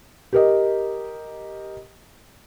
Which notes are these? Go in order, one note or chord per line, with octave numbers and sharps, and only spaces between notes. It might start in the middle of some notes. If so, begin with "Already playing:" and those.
G4 A#4 D#5